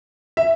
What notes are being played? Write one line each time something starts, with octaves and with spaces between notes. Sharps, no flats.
E5